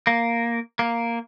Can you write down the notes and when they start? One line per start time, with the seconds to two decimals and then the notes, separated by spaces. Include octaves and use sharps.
0.07 A#3
0.79 A#3